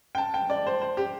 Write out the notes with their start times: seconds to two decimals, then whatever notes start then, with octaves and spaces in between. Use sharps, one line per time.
0.15 G5
0.18 A5
0.34 G5
0.50 D5
0.67 C5
0.82 C5
0.97 G4